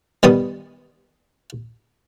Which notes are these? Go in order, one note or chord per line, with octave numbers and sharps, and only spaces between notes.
D#3 G3 B3 D#6